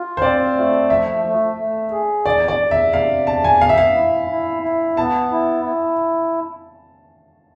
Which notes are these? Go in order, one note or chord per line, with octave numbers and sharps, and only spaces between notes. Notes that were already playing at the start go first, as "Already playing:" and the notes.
Already playing: F4
C5
C4 D5
A3
F3 E5
A3
A3
G#4
E2 D5
D5
E2
E5
C3 F5
E2 A5
G#5
B3 F5
E5
F5
E4
E4
E4
B3 A5
E4
E4